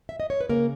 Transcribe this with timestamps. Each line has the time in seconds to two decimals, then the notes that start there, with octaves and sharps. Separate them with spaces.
0.09 E5
0.20 D#5
0.30 C#5
0.41 B4
0.49 C#3 A#3 A#4